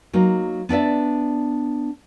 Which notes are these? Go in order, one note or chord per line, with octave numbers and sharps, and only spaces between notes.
F#3 A#3 D#4
B3 D4 D5 E5